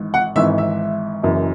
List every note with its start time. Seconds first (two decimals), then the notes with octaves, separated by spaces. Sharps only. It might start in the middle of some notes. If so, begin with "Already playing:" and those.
Already playing: G#1 G#2 E3
0.14 F#5
0.36 G#1 G#2 E3 E5
0.58 E5
1.23 F#1 F#2 E3